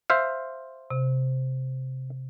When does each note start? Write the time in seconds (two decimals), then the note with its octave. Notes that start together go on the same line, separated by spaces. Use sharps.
0.10 C5 E5 F5
0.90 C3